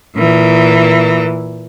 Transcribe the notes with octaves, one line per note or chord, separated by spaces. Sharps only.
A#2 E3